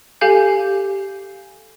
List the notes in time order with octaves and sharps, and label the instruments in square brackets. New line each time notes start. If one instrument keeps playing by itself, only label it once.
[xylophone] G4 A4 F5 G#5 G6